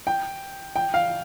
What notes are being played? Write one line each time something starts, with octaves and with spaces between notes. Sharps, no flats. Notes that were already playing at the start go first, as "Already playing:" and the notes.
G5
G5
F5